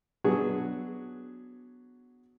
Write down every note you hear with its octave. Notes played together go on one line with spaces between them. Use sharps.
F#3 B3 D4 F#4 G#4